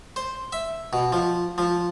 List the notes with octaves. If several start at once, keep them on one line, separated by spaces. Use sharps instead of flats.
C5
E5
B2
F3
F3